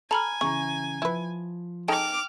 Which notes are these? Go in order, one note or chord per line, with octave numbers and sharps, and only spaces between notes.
A4 G#5 A#5 B5 F6
C#3 E3 G#4 A#5 C#6
F3 E4 B4
D#4 G#4 A4 G5 D6 F6